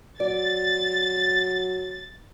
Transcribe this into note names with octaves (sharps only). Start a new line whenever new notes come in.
F#3 D5 A6